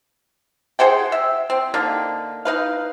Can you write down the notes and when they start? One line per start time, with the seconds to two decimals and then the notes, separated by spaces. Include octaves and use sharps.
0.79 G#4 C5 F#5 G5
1.12 E5
1.50 C4
1.74 D3 A#3 D#4
2.45 D#4 B4 F5